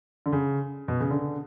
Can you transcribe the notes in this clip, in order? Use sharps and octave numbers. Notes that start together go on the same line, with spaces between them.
D3
C#3
B2
C#3
D3